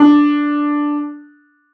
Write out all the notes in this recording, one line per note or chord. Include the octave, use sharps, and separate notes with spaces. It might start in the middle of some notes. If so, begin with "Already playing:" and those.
Already playing: D4